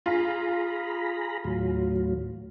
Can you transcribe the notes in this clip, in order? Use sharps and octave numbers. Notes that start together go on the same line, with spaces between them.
F4 G#4 A#5 B5
D#2 A2 F#3